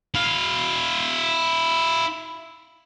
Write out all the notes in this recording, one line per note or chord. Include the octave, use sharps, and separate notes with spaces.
E4 F5